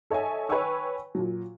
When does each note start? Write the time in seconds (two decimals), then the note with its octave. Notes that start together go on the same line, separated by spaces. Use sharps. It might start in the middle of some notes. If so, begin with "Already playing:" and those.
0.10 A4 C#5 D#5 E5 G#5
0.49 B4 C#5 G5 G#5 C#6 E6
1.15 A#2 F#3